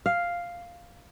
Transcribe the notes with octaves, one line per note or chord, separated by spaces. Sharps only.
F5